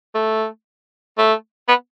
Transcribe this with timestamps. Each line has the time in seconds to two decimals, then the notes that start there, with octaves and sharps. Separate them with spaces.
0.15 A3
1.18 A3
1.68 B3